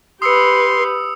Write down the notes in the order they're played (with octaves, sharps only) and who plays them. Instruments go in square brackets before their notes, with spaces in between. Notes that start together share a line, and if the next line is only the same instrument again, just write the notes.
[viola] G4 B4 [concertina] C6 [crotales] D#6 E6 C#7